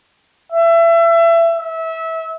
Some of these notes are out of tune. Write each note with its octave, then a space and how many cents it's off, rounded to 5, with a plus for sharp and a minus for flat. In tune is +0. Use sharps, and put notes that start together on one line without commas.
E5 +25
E5 -25